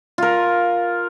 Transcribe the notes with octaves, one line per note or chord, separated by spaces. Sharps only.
F4 A#4